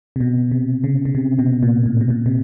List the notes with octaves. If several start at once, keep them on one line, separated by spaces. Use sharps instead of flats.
C3
B2
C3
C#3
C#3
C3
B2
A#2
A2
B2
A#2
C3